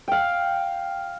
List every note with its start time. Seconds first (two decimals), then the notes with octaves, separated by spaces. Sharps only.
0.08 F5 G5